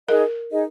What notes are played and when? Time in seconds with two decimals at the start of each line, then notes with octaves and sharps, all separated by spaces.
0.08 D#4 G#4 A#4 D#5
0.49 D#4 G#4 D#5